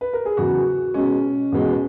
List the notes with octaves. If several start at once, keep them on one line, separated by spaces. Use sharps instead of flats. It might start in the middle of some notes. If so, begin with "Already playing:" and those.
B4
A#4
G#4
E2 C#3 F#3 F#4
B2 G#3 C#4
E2 B2 G#3